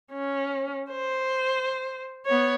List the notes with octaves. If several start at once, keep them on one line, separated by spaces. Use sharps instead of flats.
C#4
C5
B3 C#5